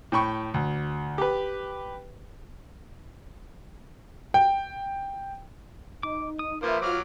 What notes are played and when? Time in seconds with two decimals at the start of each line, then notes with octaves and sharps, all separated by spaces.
0.12 A2 G5 B5 C#6
0.54 D2
1.18 G4 B4
4.34 G5
6.03 D#4 D6
6.39 D#6
6.63 F3 A#3 B4 C5 E5
6.82 F#3 F4 D6 F6